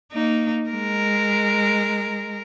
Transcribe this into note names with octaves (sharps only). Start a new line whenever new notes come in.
A#3 D#4
G#3 A#4